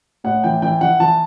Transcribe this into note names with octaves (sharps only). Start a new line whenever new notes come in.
A2 F#5
E3 G5
E3 G5
E3 F#5
E3 A5